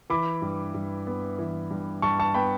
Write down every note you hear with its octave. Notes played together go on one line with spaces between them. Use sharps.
E3 B5 D6
G2
G2
B3
E3
G2
G2 A5 C#6
A5 C#6
B3 G5 B5